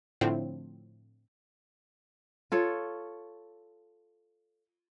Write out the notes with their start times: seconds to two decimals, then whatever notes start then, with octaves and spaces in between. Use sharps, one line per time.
0.21 A2 D3 F3 C4
2.52 F4 A4 C#5